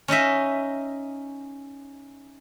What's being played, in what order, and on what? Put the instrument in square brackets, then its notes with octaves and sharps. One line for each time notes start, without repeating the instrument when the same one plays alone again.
[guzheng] C#4 D#4 D#5 E5